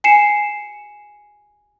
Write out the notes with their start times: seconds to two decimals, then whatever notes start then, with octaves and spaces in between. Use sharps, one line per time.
0.04 G#5 C7 C#7 E7